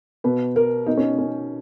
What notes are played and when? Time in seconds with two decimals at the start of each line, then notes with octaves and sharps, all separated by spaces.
0.24 B2 B4
0.56 A#4
0.87 B2 D#4
0.97 C#4
1.19 C#4